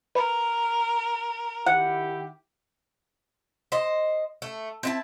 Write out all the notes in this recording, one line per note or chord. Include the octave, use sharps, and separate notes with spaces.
A#4 B4
D#3 E4 G4 F#5
C5 D#5
A3
C4 E4 A5